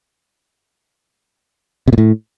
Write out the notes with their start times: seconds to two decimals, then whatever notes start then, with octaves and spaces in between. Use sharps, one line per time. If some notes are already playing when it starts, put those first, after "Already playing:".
1.88 C3
1.93 A#2
1.98 A2